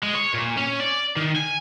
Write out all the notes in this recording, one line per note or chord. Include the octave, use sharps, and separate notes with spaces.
G#3
C#5
A#2
C#4
D5
D#3
G#5